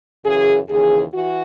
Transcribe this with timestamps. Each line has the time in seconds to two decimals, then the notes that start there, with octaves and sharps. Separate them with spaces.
0.25 F#2 C#3 E3 G#4
0.69 D#2 C#3 E3 G#4
1.14 E3 F#4